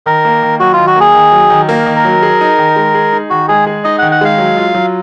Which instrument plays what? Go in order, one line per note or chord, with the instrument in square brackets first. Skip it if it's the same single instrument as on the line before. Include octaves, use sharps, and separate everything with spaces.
[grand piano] D#3 [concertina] A#4
[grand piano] A#3
D#3
[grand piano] F#3 [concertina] F#4
[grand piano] D#3 [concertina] F4
[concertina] F#4
[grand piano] A#3 [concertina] G#4
[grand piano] D#3
F#3
D#3
[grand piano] A#3 [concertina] A#4
[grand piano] D#3
[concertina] A#4
[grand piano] F#3
G#4
D#4
D#3
G#3
G#4
D#4
[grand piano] D#3 [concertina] F#4
[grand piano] G#3 [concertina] G#4
[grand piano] G#4
[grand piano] D#4 [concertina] D#5
[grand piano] D#3 [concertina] F#5
[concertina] F#5
[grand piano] G#3 [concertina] F5
[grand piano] F#3
F4
F#3